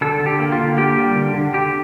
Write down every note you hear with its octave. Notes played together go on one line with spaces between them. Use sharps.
D3 A4
D3
G4
A#3
F4
D3
A#3 G4
G3
D3
D3
D3 G4